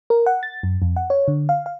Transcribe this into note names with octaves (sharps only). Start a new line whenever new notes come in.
A#4
F#5
A6
F#2
F2
F#5
C#5
D3
F5
F5